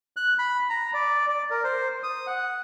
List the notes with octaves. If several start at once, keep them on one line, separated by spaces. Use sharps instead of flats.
F#6
B5
A#5
D5
D5
A#4
C5
D#6
F#5